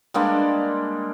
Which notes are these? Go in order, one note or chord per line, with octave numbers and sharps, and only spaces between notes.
G3 G#3 A#3 D4